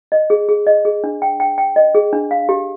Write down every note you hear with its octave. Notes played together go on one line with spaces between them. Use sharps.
D#5
G#4
G#4
D#5
G#4
D4
G5
G5
G5
D#5
G#4
D4
F5
G4